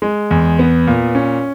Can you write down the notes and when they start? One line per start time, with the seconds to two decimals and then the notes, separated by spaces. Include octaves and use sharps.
0.02 G#3
0.31 E2
0.59 B3
0.87 A#2
1.15 C#4